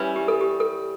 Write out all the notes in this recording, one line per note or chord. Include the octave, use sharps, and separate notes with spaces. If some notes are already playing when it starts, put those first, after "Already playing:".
Already playing: E3 G3 C#4
G4
A4
G4
A4